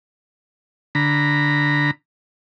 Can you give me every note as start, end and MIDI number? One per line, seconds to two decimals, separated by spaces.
0.95 1.91 50
0.95 1.91 82
0.95 1.91 83